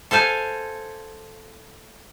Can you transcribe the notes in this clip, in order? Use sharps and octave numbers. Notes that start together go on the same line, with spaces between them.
A4 C5 F5 G#5